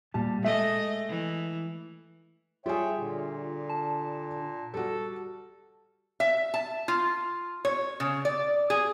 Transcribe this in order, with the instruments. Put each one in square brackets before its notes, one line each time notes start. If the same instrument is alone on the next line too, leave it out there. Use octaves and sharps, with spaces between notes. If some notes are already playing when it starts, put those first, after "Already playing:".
[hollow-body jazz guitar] A#2 G3 A5
[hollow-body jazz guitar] G#3 E5 [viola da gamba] A3 D#5
[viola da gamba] E3
[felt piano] G3 G#4 [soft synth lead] F4 [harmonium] C#5 E5 G5
[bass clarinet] A#2 [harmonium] D3
[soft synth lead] A5
[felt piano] G3 F#4 [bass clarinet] A4
[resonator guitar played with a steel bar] E5
A5
F4
C#5
C#3
D5
G#4